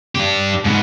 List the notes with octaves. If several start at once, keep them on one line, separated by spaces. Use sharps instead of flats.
D4 G4
G#2 B3